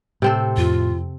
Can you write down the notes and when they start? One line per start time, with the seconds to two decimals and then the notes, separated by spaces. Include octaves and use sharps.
0.22 A2 C3 C4 A4
0.57 F2 F4